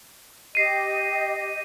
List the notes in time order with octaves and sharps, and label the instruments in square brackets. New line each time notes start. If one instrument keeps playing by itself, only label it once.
[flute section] G4 D#5 [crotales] C7 D#7